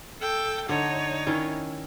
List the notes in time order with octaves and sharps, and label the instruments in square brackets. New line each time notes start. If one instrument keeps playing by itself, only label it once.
[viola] A4 G5
[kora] D3 [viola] D#4 C#5
[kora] D#3 C#4 E4